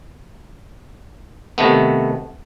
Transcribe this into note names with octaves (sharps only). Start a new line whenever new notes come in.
C3 D#3 A3 B3